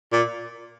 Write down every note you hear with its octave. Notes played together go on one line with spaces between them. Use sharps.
A#2